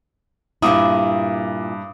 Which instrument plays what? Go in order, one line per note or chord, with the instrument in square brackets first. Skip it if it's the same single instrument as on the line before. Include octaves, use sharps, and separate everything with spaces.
[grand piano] G2 D6 D#6 [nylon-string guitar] A#2 E4